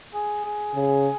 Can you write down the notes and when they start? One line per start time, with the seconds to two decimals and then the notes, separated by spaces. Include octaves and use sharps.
0.14 G#4
0.45 G#4
0.75 C#3